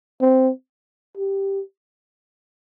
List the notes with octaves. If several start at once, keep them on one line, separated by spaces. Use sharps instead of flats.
C4
G4